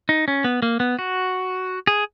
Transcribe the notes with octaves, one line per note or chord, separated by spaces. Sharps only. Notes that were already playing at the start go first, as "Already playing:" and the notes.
D#4
C#4
B3
A#3
B3
F#4
G#4